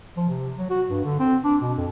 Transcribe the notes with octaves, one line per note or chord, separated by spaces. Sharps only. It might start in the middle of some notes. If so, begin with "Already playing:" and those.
F3
C3
F#3
F#4
G2
D3
C4
D4
B2
F2